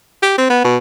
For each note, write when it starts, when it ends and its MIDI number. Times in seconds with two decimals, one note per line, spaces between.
0.22 0.34 67
0.38 0.48 60
0.50 0.60 59
0.65 0.78 47